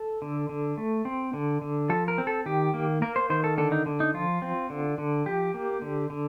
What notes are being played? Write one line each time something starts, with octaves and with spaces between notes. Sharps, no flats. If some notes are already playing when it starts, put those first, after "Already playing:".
Already playing: A4
D3
D3
A3
C4
D3
D3
F3 A4
A#4
C4
A4
D#3 G4
A#3
A#3 A#4
C5
D#3 C5
A4
D3 A4
D#4
D3
D#4
F3 F4
C4
D3
D3
F3 G4
A#3
D3
D3